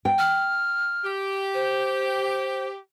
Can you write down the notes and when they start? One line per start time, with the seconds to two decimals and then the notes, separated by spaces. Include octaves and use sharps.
0.05 G5
0.19 F6
1.04 G4
1.54 C5